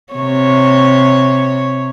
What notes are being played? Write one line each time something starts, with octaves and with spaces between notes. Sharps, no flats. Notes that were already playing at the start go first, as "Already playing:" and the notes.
C3 C#5